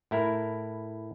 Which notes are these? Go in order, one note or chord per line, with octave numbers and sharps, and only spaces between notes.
A2 E4 A#4